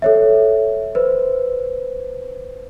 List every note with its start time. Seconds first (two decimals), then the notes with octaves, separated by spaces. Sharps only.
0.02 A4 C#5 E5
0.95 B4 C5